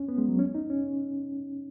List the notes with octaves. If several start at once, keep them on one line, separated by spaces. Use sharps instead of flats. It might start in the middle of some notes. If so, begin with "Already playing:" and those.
Already playing: C#4
B3
G#3
F#3
C#4
D#4
C#4